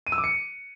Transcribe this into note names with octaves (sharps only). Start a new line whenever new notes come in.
D#7
E6
D6
C#7